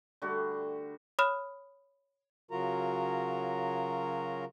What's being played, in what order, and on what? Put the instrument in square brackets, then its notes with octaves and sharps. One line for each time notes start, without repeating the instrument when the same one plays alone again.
[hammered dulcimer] D3 G3 A3 F#4
[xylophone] C#5 B5 D#6 F6 E7
[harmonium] C#3 F#3 F4 F#4 A#4 A#5